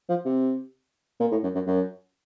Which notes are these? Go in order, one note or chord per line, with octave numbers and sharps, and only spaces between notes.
F3
C3
A#2
A2
F#2
F#2
F#2